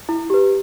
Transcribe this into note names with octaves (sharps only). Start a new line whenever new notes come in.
E4
G4 B4